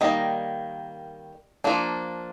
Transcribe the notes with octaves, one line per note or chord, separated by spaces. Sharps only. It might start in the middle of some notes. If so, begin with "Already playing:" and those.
D#3 G3 A#3 D#5
F3 A#3 D4